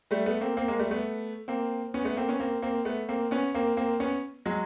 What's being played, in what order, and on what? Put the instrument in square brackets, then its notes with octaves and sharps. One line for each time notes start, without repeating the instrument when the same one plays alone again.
[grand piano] G3 A3
A3 B3
A#3 C4
A#3 C4
G#3 A#3
G3 A3
A3 B3
A#3 C4
B3 C#4
A3 B3
A#3 C4
B3 C#4
A#3 C4
A#3 C4
A3 B3
A#3 C4
B3 C#4
A#3 C4
A#3 C4
B3 C#4
F#3 G#3